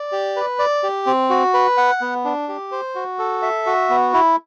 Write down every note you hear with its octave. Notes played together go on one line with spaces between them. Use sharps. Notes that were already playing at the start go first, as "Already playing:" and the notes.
Already playing: D5
G4
B4
D5
G4
C4
F#4
B4
F#5
B3
D4
G4
C5
F#4
A4
E5
F#4
B3
E4